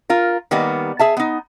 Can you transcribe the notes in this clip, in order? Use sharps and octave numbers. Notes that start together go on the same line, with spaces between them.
F4 A#4
D#3 G3 A#3 B3
G#4 E5 A5
B3 D#4